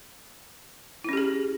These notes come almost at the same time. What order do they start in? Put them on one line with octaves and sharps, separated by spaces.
E4 C#4 G4 G#4